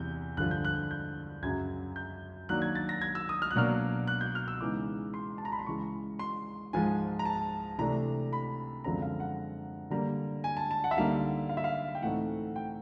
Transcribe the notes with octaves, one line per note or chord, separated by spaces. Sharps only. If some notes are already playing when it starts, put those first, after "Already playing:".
Already playing: E2 C3 G6
G2 D3 F3 F#6
G6
F#6
G6
F#2 C#3 F#3 G#6
G6
D#3 F#3 A#3 D4 F#6
G#6
A6
A#6
G#6
E6
D#6
F6
F#6
B2 F#3 A#3 D4 F6
F#6
G6
F6
E6
C#3 E3 G#3 B3 D#4 D6
C6
A5
A#5
B5
C6
C#3 E3 G#3 C#6
C6
G#2 F3 G#3 G#5
A#5
A5
C3 E3 A3 D4 A#5
B5
F#2 D3 F3 G#3 C4 A#5
F5
F#5
D3 G3 A#3 A#5
G#5
A5
A5
F#5
E5
D3 G3 A#3 D#4 F5
F5
E5
F5
G5
A2 E3 A3 C4 D#4 F#5
G5